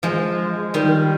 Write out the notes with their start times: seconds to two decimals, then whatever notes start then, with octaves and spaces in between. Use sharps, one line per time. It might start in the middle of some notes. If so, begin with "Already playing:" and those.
0.03 F3 G#3
0.74 D#3 G3